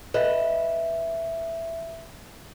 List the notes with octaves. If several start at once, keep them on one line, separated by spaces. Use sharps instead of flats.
B4 D#5 E5